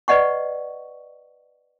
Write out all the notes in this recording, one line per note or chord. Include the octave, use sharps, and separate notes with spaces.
B4 D5 D#5 F#5 C#6